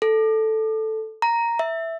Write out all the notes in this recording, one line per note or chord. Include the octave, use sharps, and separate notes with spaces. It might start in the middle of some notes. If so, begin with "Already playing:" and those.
A4
A#5
E5